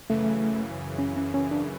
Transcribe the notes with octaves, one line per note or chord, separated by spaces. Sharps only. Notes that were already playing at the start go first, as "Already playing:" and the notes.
F#2 C#3 E3 A3
C#4
C#4
C#4
D4